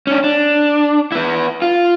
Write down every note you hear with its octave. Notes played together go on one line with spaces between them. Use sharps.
C#4 D4
D4
B3 E4
F4